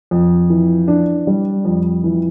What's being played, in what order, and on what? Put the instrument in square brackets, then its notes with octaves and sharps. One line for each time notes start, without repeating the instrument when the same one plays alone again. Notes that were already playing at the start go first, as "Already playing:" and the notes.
[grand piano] F2
E3
D4
G3
F2
E3